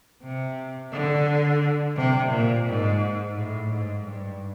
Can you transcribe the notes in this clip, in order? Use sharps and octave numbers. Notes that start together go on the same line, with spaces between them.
C3
D3
C3
A#2
G#2
A2
G#2
G2